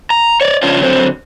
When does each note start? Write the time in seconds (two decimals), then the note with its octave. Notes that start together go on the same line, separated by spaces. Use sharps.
0.10 A#5
0.41 C#5 D5
0.63 C#3 F3 C#4 D4 F4
0.80 D3 F#3 C4